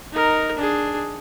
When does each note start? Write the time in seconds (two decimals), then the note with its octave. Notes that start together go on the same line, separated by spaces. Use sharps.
0.12 D#4 A#4
0.56 D4 G#4